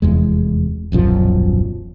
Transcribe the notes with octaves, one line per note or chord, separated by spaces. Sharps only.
F1 E2 G#3
D#1 B1 F#2 F3